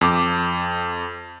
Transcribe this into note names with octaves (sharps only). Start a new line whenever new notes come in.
F2 D6